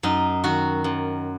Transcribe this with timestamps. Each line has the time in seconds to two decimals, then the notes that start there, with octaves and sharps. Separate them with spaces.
0.03 F#2 D#4
0.44 D#3 F#4
0.84 F#2